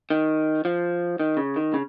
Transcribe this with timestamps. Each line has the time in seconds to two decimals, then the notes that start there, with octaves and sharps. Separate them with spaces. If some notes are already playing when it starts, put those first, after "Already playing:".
0.10 D#3
0.65 F3
1.20 D#3
1.37 C#3
1.56 D#3
1.74 C#3